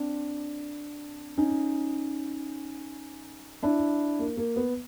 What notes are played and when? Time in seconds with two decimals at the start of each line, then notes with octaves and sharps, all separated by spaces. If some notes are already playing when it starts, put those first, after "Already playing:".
Already playing: C4 D4
1.37 C#4 D#4
3.63 D4 E4
4.19 A#3
4.37 A#3
4.56 B3